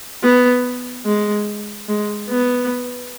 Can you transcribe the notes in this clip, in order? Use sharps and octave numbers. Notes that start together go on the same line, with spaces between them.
B3
G#3
G#3
B3